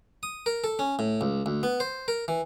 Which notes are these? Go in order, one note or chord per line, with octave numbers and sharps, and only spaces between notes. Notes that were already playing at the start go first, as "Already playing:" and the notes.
D#6
A#4
A4
C#4
A2
C#2
D2
B3
C5
A#4
E3